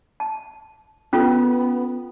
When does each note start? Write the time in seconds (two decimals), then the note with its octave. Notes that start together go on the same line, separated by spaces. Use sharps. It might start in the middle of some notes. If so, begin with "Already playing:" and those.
0.20 A5
1.13 B3 C#4 F4 A4